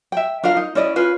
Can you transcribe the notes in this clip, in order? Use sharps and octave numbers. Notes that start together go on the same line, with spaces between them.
E5 G5
D4 F4 A#4 F5
D#4
C#4 E4 D5 D#5
C#4 F4 B4 F5